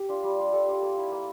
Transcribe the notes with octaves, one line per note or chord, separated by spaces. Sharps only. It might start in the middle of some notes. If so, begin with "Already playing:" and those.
Already playing: G4
D4 F4
G3
D4 F4
G3 A4
D4 F4
A#3 A4
E4
A#3